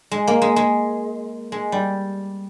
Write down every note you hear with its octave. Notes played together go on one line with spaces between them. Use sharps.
G#3
A#3
G#3
G#3
G#3
G3